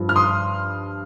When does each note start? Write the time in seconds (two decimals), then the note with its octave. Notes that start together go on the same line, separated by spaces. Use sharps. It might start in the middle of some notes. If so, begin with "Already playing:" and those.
Already playing: G2 F3
0.09 F6
0.16 C6 D#6